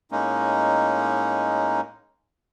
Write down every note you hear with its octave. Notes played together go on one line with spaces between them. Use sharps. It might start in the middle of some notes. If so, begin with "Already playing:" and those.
A2 G#3 A#3 C#4 D#4